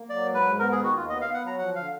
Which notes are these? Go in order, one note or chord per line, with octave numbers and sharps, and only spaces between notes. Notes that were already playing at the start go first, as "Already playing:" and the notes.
Already playing: A#3
F#3 D5
G#2
B4
G#2
B3 A#4
D#3 G#4
F#4
D#2 F4
B3 D#5
F5
B3
F#5
F#3 A#5
F3 F#5
D3 F5